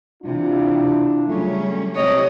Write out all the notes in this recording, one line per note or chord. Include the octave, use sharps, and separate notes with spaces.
C3 E3 D4 E4 F4
C#3 F#3 G3 A3 C#4
C3 A3 C#5 D#5